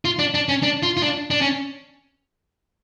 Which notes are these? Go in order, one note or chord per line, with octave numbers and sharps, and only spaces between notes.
F4
D4
D4
C#4
D4
F4
F4
D4
D4
C#4